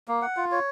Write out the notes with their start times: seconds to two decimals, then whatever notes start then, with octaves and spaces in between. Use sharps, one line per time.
0.08 A#3
0.22 F#5
0.37 F4
0.52 C#5